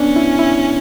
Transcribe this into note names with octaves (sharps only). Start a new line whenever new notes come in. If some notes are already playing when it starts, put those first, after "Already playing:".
Already playing: B3 C#4 D4
E4
E4